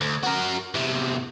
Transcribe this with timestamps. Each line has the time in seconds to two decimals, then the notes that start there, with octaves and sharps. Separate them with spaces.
0.01 D2
0.23 F#4 A#4
0.74 E2 C3